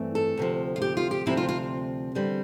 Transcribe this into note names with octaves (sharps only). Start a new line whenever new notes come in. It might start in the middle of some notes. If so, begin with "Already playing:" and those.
Already playing: G2 E3 A3 C4
A4
D2 C3 F3
F4
G4
F4
G4
D2 C3 F3 C4 E4
F4
F4
E2 D3 G3 C4